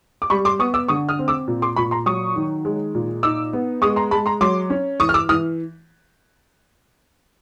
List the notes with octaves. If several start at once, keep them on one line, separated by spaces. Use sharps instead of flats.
D6
G3 B5 C#6
C6 D6
B3 C#6 D#6
D6 E6
D3 C#6 D#6
D#6 F6
C4
D6 E6
A#2
C6 D6
A#2 B5 C#6
A#5 C6
F#3 C#6 D#6
D#3
G#3
A#2
D#4 D6 E6
B3
G#3 C#6 D#6
A#5 C6
G#3 A5 B5
A#5 C6
F#3 C6 D6
C#4
E3 C#6 D#6
F6
D6 E6
E3 D#6 F6